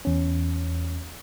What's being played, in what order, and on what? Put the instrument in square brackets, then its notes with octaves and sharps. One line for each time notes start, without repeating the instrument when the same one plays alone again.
[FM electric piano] E2 C#4